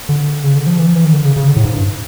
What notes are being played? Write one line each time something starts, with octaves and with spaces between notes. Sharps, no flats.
D3
C#3
D3
F3
E3
F3
E3
D#3
D3
C#3
C#3
D3
A2
G#2
G2